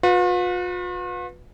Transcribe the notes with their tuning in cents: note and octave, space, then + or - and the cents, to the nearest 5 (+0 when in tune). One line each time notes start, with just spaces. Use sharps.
F4 +45 B4 +0